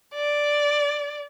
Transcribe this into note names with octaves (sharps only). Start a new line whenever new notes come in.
D5